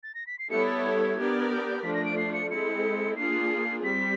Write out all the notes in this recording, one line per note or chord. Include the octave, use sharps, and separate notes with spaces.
A6
A#6
B6
C7
G3 B3 E4 A4 C#5 C#7
A6
G#6
B3 D4 G4 A#4 D5
G#6
G6
G6
F3 A3 D4 B6
A#6
D7
C7
C#7
G#3 C4 E4 A4 C#7
A#3 D4 F4 G#4 C7
G3 C4 B6